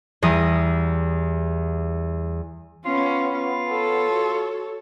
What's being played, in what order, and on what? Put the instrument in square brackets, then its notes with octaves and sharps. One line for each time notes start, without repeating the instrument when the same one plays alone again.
[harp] E2 G3 A#5 D#6
[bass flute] B3 [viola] C#4 [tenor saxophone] F4
[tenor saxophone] F4
[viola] A4 C#5
[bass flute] F#4